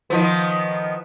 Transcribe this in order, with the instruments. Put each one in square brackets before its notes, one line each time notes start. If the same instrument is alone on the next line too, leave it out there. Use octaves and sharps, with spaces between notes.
[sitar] D#3 F3 B3